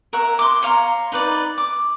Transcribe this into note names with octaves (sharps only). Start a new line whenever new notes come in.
A#4 C#5 E5 F#5
C6 D6
C#5 F5 A#5 C6
D#4 B4 D5
D6